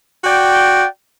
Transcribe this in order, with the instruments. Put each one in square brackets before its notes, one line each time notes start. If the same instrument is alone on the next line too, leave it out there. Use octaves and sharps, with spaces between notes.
[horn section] F#4 D5 G5